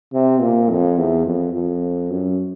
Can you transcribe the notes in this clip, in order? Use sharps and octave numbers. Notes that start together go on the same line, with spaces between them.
C3
A#2
F2
E2
F2
F2
F#2